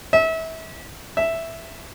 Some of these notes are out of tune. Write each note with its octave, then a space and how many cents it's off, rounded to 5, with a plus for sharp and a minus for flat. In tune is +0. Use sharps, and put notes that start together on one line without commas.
E5 -30
E5 +0